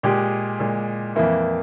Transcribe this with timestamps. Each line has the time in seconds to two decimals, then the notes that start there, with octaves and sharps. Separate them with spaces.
0.03 A#2 G#3 G4
0.60 A#2 G#3
1.15 F2 E3 A#3 E4